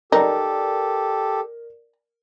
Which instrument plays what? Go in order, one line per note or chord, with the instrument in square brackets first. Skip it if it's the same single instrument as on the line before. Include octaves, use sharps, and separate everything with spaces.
[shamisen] D#4 [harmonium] G4 A4 [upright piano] A#4 D5